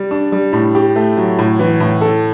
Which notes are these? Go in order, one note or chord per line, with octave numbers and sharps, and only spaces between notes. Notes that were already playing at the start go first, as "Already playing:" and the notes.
Already playing: G3
D4
G3
A2
G4
A3
F#3
A2
E3
A2
A4